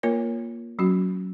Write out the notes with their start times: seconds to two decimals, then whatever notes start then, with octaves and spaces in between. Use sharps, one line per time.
0.03 A#3 F4 A#4 C#5
0.79 F#3 C#4 F#4